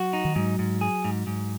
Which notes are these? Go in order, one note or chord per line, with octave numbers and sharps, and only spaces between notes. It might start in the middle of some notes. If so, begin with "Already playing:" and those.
Already playing: F#3 F#4
D#4
D#3
G#2 F#3
G#2
G#4
G#2
G#2